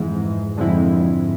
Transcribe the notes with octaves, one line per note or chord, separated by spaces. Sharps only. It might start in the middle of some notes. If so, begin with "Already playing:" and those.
Already playing: F2 G#2 E3 G#3
F2 D3 G#3 C4 E4
G#2